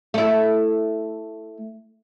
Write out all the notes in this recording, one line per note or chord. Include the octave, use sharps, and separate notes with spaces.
A3 E4